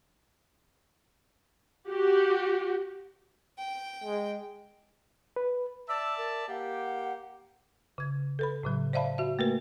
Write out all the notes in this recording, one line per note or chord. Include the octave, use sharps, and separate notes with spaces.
F#4 G4
G5
G#3
B4
D5 E5 A5 E6
A#4
A#3 G4 F#5
C#3 G#6
A4 B4 B5
A2 C#3 F#3
C5 D5 E5 F5 A5 B5
F#4 E5
A3 A#3 F#4 A#4 B4